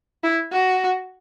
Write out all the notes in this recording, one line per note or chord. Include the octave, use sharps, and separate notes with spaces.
E4
F#4